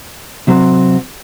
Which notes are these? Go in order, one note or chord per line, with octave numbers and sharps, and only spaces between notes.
C3 F#3 C4